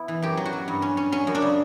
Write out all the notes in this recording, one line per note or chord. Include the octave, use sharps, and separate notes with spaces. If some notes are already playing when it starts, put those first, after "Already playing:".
Already playing: B3 E4
E3
F#2 G4
F#3
F#4
F#3
G2
C#4
C#4
F#3 C#4
F#2
D4
C#3